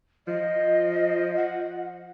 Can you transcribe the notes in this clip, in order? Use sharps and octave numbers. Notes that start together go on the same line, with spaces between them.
F3 D#5
F#5